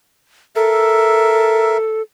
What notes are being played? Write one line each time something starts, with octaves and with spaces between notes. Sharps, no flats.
A4 A#4 E5